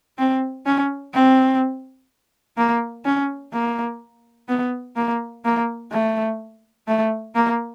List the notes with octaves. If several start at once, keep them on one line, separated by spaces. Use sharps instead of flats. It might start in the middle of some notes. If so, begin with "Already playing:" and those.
C4
C#4
C4
A#3
C#4
A#3
B3
A#3
A#3
A3
A3
A#3